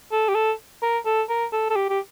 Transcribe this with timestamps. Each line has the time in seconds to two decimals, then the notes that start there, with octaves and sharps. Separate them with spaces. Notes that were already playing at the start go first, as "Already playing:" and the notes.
0.12 A4
0.28 G4
0.35 A4
0.82 A#4
1.05 A4
1.29 A#4
1.52 A4
1.70 A4
1.76 G4
1.90 G4